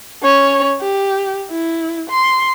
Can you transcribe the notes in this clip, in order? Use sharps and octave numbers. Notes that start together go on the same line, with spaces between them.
C#4 C#5
G4
E4
C6